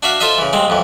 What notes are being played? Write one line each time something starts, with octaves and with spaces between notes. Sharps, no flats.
D4 F#4 E5 F5
F4 A4 C5 D#5 E5
C#3 E3
D#2 G#3 C4
B1 F2 E3